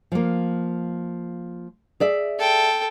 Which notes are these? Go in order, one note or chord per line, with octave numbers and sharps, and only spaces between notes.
F3 A#3
G#4 D5 E5
A4 G5